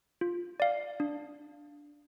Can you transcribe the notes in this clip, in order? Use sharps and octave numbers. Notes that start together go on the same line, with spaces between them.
F4
D5 F5
D4